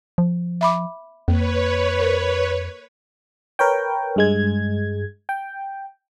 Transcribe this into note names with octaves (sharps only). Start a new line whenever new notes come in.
F3
E5 B5 D6
F2 A#3 B4 C#5
A#4 C5
A#4 B4 C#5 G5
G2 G#3 G#6
G5